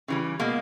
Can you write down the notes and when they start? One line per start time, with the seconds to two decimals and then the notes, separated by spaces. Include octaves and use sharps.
0.08 C#3 E3 G3
0.40 B2 G#3 A#3